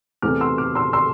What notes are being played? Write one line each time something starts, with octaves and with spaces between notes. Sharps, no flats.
E2 C3 E3 A3 C4 D6 F6
C6 E6
D6 F6
C6 E6
C6 E6